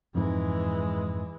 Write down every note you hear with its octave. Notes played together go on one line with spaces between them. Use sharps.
F2 G#2 E3 G#3